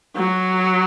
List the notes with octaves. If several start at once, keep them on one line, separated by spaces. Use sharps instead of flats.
F#3